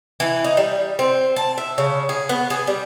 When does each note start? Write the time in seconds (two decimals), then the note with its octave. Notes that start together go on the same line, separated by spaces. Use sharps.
0.20 E3
0.44 D#4
0.57 G3
0.99 C4
1.36 A5
1.58 E5
1.78 C#3
2.09 G#4
2.29 B3
2.50 G#4
2.67 G3